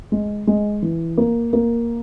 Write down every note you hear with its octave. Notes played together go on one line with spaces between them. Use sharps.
G#3
G#3
E3
A#3
A#3